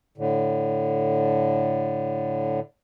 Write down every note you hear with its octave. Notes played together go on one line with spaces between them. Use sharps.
A2 D3